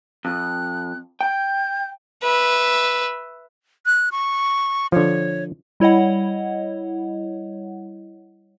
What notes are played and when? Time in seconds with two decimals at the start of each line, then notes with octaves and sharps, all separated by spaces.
0.25 F2 F#6
1.21 G5 G6
2.23 B4 E5
3.86 F#6
4.12 C#6
4.92 D3 F3 C#5
5.80 G3 E4 C#5 D#5 F#5